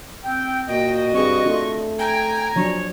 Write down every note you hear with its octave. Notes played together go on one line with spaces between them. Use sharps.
C4 G5
A#2 F#4 D#5 G5
G2 C4 G#4 C#6
A3 D4 F4
G5 G#5 A#5
F3 F#3 D4 C#5